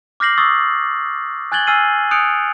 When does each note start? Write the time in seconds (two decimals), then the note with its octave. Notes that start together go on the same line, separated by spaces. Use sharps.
0.20 D6 F6 G6 A#6 C7 F#7
0.38 C#6 D#6 E6 A6
1.52 G#5 F#6 G#6 A6 F#7 G7
1.67 G#5 E6 F6 A6 C7 D#7
2.11 D#6 F#6 G6 C#7 D7 F7